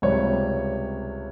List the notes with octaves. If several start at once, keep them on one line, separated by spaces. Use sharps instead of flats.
C#2 C3 G3 C#5